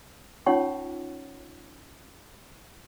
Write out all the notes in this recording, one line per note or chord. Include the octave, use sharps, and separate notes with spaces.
C#4 D#4 F4 C#5 F#5 C#6